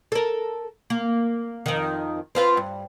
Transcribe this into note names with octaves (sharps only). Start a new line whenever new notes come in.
A4 A#4
A#3
F2 D#3
C4 F4 B4
G2